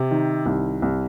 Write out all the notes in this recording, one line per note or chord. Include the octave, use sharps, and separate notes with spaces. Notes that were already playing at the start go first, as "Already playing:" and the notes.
Already playing: C3
D#3
C2
C2